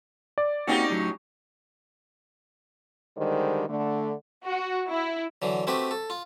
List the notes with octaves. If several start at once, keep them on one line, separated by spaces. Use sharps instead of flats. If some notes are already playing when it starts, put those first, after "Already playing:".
D5
A#3 C4 C#4 D#4 F#4 G4
A2 F#3
D3 D#3 G3 G#3 C5
D3 A3
F#4
E4
D3 E3 F#3
A3 C4 F#4 G4 B4
A4
F4